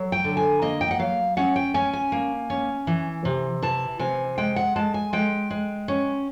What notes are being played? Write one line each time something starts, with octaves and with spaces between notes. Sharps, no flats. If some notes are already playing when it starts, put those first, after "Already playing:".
Already playing: F#3
G5
D3
G#5
A#3 D#5
G5
F#5
F#3 F5
C#4 F#5
G5
C#4 G#5
G#5
A#3
C#4
E3
C3
E3 A5
C3 G#5
G#3 G5
F#5
G#3 A5
G#5
G#3 G5
G#3
C#4